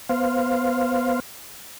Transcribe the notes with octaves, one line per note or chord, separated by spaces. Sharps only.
B3 C5 F5